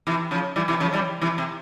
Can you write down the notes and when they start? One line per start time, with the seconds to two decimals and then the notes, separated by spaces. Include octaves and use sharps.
0.07 C3 E3
0.31 C#3 F3
0.56 E3 G3
0.68 C3 E3
0.80 C#3 F3
0.93 E3 G3
1.22 C3 E3
1.38 C3